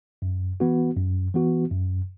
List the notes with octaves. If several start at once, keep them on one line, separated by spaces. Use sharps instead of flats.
F#2
E3 B3 F#4
F#2
E3 B3 F#4
F#2